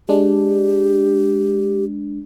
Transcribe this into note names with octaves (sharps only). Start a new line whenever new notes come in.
G#3 D4 G4